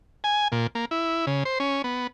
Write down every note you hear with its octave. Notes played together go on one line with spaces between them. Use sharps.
G#5
A#2
A#3
E4
C#3
C5
C#4
B3